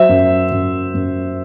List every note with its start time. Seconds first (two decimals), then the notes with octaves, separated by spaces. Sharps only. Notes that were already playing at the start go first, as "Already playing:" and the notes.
Already playing: F#3 C5 E5
0.09 F#2
0.52 F#2
0.95 F#2